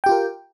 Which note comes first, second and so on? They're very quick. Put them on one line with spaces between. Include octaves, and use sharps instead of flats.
G5 G4 F4 A#4